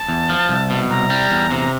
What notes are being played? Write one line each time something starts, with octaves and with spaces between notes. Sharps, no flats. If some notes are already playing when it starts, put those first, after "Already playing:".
Already playing: A5
E2
F3
C2
B2
C2 A#5
G3
E2
C3
A#5